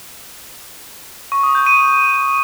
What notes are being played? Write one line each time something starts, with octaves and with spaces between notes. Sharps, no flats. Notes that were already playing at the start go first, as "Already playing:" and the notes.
C#6
D#6
G6
D#7